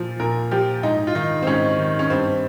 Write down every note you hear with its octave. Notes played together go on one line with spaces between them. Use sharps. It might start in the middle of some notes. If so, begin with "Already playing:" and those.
Already playing: A#2 F3
A#2 A#4
F3 G4
G#2 D#4
F4
D#3 D#4
C4
G#2 C#4
D#3
C#4
G2 C4